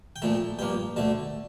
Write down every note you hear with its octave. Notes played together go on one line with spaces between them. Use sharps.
G5
A#2 F3 A3 A5
G2 F3 A#3 G5
D2 D3 A3 A5